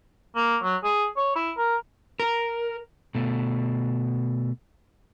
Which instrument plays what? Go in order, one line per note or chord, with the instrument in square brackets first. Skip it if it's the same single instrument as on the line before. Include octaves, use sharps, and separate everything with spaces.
[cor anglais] A#3
F#3
G#4
C#5
E4
A#4
[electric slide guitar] A#4
B2 A3